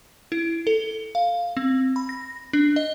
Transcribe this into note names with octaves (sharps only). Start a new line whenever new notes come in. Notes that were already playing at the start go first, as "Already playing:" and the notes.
E4
A4
F5
C4
B5
A#6
D4
D#5